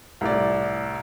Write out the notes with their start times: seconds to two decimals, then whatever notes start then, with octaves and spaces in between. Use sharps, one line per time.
0.21 C2 A2 D5